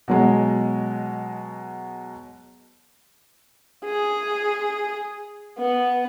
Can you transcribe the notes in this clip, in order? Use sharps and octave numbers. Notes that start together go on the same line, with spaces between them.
B2 F#3 G#3
G#4
B3